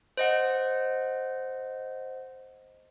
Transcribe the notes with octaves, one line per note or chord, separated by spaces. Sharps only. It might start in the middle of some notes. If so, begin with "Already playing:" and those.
C5 D#5 F#5